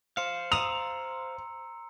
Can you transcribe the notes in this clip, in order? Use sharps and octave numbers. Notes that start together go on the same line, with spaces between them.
C5 F5 C#7
A#5 C6 D#6 E6 F7